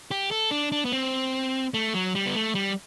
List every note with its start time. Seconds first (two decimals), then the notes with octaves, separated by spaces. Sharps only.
0.11 G4
0.31 A4
0.51 D4
0.72 D4
0.85 B3
0.93 C4
1.74 A3
1.94 F#3
2.15 G3
2.26 B3
2.36 A3
2.55 G3